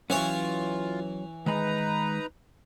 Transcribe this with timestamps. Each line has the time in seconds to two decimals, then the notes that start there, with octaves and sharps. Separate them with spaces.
0.10 E3 F#3 C#4 F4 C#5
1.46 D#3 G#3 D#4 B4 A#5 B5